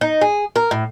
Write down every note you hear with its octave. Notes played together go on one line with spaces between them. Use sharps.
D#4
G#4
A#4
A2